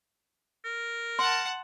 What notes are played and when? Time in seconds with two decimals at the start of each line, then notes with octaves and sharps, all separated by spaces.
0.64 A#4
1.19 F#5 A5 C6